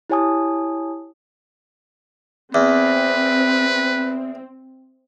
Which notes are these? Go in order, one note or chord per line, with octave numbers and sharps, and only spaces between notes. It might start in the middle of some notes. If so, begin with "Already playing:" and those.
E4 G4 C#5 G#5 A5 D#6
E2 C4 B4